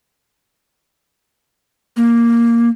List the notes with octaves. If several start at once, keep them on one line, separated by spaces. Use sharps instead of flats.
A#3